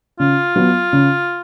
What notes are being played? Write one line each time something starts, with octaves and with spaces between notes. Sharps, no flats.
C#3 F4
F#3 B3
C#3